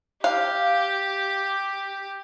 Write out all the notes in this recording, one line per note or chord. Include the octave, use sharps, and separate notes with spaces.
G4 F5